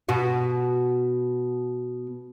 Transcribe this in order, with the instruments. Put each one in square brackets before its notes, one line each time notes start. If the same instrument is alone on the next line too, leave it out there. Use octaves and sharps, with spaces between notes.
[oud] B2 F#4